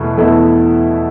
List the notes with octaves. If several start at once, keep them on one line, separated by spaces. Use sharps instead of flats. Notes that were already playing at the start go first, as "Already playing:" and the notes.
Already playing: E2 B2 A3 E4
E2 B2 A3 E4 A4